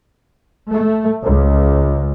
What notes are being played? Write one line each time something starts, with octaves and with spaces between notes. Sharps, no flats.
A3
C#2